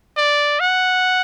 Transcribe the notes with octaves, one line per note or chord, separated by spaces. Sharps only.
D5
F#5